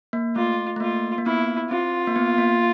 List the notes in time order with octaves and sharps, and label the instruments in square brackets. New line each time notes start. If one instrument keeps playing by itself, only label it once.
[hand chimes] A#3
[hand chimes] A3 [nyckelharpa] F4
[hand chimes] A3
[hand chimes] A#3 [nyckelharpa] F4
[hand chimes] A#3
[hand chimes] B3 [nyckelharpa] E4
[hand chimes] C4 [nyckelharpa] F4
[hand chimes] A#3
B3
A#3